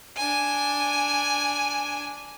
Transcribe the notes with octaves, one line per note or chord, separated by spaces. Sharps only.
D4 G#5